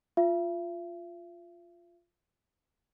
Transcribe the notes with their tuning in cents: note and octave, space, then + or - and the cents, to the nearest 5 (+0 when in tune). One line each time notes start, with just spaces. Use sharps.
F4 +0 E5 +45